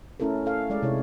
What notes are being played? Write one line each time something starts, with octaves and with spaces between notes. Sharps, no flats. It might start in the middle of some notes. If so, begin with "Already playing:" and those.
A3 C#4 E4 A4 A#4
A4 C#5 F5
G#3 D5
C3 D#4 E4 C#5